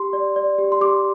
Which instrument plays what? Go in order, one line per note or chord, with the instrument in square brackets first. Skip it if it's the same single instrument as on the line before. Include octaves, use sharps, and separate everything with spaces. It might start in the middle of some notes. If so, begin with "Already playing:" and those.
Already playing: [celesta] G4 C6
D5
D5
G4
C6
G4 D6